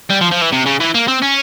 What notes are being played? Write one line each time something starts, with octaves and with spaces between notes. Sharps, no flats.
G3
F3
F3
E3
C3
C#3
E3
A#3
C4
C#4